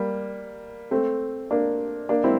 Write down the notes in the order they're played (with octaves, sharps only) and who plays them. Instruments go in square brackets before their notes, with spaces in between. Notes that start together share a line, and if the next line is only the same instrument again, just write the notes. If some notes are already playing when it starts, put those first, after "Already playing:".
Already playing: [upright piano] G3 A#3
A3 C4
A#3 D4
A#3 D4
C4 E4